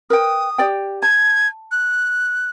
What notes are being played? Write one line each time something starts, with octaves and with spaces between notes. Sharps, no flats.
A#4 B4 G5 D#6
G4 D5 G5
A5 G#6
F#6